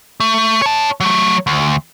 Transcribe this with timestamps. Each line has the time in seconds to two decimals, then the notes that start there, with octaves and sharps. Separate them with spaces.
0.20 A3
0.62 C#5 A5
1.00 F#3 A3
1.47 D2